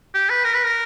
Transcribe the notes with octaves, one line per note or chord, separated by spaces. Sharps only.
G4
B4
A#4
B4
A#4